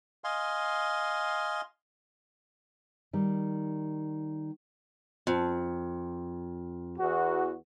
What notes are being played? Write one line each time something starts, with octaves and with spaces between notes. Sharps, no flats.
D#5 F5 G#5 C6
D#3 G3
F2
E2 F#4